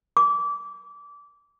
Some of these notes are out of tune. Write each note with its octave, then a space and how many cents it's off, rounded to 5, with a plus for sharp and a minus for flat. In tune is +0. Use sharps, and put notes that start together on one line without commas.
D6 -25